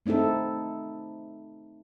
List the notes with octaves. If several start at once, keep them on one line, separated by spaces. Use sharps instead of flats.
A3 C4 D#4 E4 A4